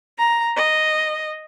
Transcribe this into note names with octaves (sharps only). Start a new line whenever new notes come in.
A#5
D#5